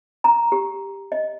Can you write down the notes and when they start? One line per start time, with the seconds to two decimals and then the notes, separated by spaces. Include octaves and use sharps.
0.24 A#5
0.52 G4
1.12 D#5